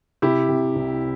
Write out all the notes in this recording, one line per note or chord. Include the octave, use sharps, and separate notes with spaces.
C3 E4 G4
C3
C2